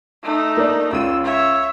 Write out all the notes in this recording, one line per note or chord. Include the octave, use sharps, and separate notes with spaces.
A3 D#4
A#3 D4
C#2 E6 D#7
C#5 E5